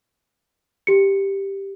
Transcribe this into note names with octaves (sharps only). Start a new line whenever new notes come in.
G4 C#7